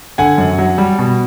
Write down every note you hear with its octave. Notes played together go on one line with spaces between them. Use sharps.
D3 F#5 G#5
F#2
F#3
G3
B2